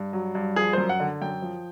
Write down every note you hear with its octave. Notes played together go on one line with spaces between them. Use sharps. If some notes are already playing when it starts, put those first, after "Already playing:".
Already playing: G2
F#3
G2
F3 G#4
F#2 C5
F#5
D3
F#2 G5
F3